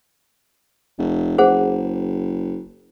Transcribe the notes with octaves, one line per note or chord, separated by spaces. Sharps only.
F1
F#1 G#4 C5 F#5